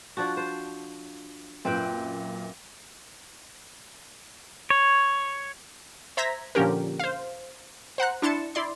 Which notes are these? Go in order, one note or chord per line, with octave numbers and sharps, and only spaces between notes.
F3 D4 F#4
C5
F#2 A#2 C4 B4 G5
C#5
C5 E5 A#5 G#6 A#6 B6
A#2 D3 F3 C#4 G4 A#4
C5 F5
C5 F#5 A#5 F#6
D4 E4 C6 A6 C#7 E7
E4 D5 C6